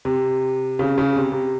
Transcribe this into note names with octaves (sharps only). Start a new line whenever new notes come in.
C3
C#3
C#3
C3
C3